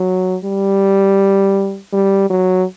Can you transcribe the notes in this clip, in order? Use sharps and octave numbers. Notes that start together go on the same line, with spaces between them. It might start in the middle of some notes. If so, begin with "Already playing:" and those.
Already playing: F#3
G3
G3
F#3